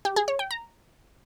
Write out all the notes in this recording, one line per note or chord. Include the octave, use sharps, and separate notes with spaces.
G4
G#4
C#5
G5
A#5